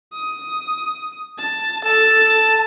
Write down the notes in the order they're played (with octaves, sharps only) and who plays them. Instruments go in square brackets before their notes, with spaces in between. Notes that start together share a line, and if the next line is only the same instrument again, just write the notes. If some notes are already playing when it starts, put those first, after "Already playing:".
[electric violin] D#6
A5
[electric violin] A4 A6 [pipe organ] A5